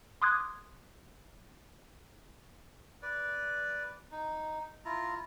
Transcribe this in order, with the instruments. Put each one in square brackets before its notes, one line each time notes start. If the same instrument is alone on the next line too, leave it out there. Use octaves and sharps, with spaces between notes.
[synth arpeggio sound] C6 D6 D#6 F#6 G#6
[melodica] B4 D5
D#4
E4 F4 A#5